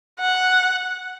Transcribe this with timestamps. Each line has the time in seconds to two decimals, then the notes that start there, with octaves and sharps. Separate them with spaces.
0.20 F#5